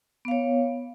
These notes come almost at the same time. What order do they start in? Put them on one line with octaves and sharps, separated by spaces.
B3 F5 C#5